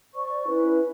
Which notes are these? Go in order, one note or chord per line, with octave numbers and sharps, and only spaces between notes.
C5 D5 C#6
C#4 E4 B4